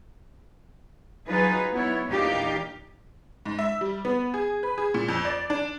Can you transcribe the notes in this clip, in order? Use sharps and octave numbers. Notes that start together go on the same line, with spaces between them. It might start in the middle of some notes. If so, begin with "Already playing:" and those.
F#3 D#4 F4 G#4 B4
B3 E4 C#5
E2 A#2 D4 D#4 G4 F5
G#2
E5
G3
B3
G#4
B4
G#4
A#2
F2
D5
D4